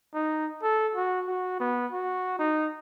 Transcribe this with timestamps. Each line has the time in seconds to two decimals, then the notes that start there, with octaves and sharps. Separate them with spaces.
0.14 D#4
0.63 A4
0.95 F#4
1.28 F#4
1.60 B3
1.91 F#4
2.39 D#4